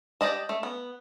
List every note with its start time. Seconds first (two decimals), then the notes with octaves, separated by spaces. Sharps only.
0.21 G4 D5 D#5 A5
0.49 A3
0.63 B3